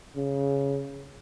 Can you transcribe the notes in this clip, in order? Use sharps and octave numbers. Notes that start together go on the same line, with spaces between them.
C#3